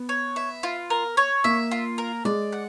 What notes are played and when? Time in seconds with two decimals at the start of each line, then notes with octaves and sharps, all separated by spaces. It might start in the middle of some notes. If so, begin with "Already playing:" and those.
Already playing: B3
0.09 C#5
0.36 E5
0.63 F4
0.90 A#4
1.17 C#5
1.44 A#3 E5
1.71 F4
1.98 A#4
2.25 G#3 D5
2.53 F#5